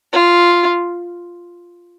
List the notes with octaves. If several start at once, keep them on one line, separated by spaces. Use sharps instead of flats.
F4